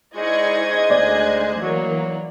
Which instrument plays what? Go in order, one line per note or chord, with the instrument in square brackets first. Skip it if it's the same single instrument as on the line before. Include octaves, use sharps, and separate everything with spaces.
[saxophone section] G#2 G#3 C5 [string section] E4 D5 C#6 [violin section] D#5 G#6
[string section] D2 G#5 F#6 [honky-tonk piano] D5
[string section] E3 A#3 [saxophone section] F#3